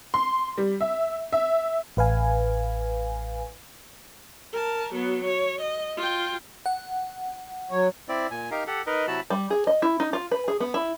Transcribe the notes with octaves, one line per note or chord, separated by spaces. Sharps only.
C6
G3
E5
E5
A1 B4 F5 G#5
A#4 A5
F#3 B3
C#5
D#5
F4 G5
F#5
F#3 C#5
C4 E4 D5
A#2 G#5
D#4 G4 A#4 F5 A#5
G4 A4 F#5
D#4 A#4 B4 D#5
C3 F#3 E4 F#4 A5 B5
G3
G#4
D#5
E4
D#4
F4
B4
G#4
B3
E4